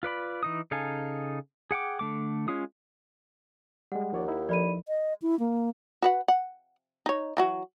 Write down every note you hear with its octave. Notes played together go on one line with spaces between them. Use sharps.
F4 B4 D5 B5
E3 D#4 D#6
C#3 D#4 A4 F5 G#5
G#4 F#5 G5 D6
D3 A3 D6
G#3 C#4 F4 D#6
G3 G#3 F#5
D#2 F3 C#5 D5
D#4 E4
F3 A4 B4 D5 B5 D#7
D#5
E4
A#3
F#4 B4 F#5
F#5
D#4 C#5
E3 F#3 F#4